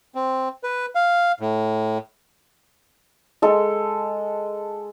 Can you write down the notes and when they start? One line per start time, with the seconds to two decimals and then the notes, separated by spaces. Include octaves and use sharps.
0.15 C4
0.63 B4
0.95 F5
1.40 A2
3.42 G#3 A4